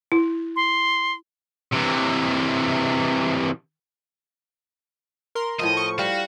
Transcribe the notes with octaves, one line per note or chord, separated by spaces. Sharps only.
E4
C6
C3 E3
A#4 C6
A2 F3 F4 D#5
C#6
G3 F#4 F5